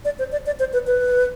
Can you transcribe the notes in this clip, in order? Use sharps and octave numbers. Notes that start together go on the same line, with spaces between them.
D5
C5
D5
D5
C5
B4
B4